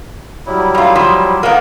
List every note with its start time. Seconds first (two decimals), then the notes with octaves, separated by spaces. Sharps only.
0.46 F#3 G3 E4
0.75 F#2 F4
0.95 F3
1.43 A#3 B3 D#4 E4